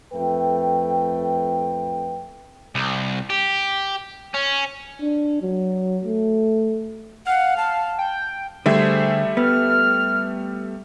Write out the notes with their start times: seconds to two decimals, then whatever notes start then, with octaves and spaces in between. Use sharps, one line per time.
0.14 F2 A3 B4 G5
2.75 C2
3.30 G4
4.34 C#4
5.01 D4
5.42 F#3
6.04 A3
7.27 F5 F#5
7.57 A5
7.99 G5
8.66 D3 G3 A3 G#4 C5 E5
9.37 B3 F6